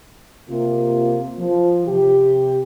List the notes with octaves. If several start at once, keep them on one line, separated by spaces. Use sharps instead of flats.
C3 A#3 F4
F3
C3 G4